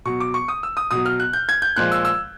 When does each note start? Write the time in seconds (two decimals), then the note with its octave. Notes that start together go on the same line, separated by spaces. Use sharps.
0.05 B2 F#3 C#6
0.20 D6
0.34 C#6
0.48 D#6
0.63 E6
0.77 D#6
0.91 B2 F#3 D#6
1.06 F6
1.20 F#6
1.33 G6
1.49 G#6
1.62 G6
1.76 A#2 F3 G#3 F#6
1.92 E6
2.05 E6